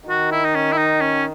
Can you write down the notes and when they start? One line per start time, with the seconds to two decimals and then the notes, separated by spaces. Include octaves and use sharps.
0.09 D#3 F#4
0.31 E4
0.44 D#4
0.55 C#4
0.72 E4
0.77 D#4
1.01 C#4